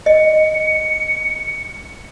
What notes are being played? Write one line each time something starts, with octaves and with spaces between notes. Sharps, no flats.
D#5 C#7